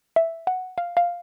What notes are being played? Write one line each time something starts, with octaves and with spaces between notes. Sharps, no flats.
E5
F#5
F5
F5